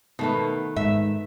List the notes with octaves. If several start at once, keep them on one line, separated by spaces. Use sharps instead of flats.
B2 D#3 A3 B4
G#2 E5